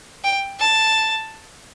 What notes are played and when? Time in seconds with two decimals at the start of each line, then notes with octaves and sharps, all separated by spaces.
0.24 G5
0.60 A5